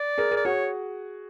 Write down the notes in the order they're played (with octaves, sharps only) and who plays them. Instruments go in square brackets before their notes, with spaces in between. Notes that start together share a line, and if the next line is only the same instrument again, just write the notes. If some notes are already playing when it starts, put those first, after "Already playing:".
Already playing: [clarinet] D5
[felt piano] G#4 A#4
G#4 A#4
[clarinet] D5
[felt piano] F#4 G#4 [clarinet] C#5